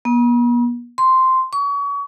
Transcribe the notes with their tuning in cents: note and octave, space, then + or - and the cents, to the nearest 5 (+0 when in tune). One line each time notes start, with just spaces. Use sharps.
B3 -45
C6 -5
C#6 +35